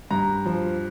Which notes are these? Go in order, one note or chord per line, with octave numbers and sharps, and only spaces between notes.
G2 A#5
F3